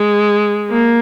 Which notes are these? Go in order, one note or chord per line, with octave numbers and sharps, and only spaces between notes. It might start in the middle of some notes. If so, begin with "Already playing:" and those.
Already playing: G#3
A#3